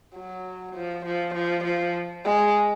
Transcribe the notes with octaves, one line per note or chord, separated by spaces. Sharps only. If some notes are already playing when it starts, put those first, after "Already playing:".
F#3
F3
F3
F3
F3
G#3